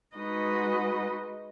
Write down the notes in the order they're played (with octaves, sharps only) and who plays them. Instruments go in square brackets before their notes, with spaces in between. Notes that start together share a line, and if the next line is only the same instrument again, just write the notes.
[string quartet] G#3 D#4 F#4 B4 D#5